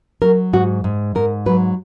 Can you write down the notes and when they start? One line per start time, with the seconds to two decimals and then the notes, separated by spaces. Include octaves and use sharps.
0.22 F#3 A#4
0.53 G#2 F#4
0.84 G#2
1.15 G#2 A#4
1.46 F#3 B4